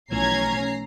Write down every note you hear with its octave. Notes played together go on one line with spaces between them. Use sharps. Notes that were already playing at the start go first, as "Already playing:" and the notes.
B1 E3 F3 A3 C#4 A#5 G#6 C7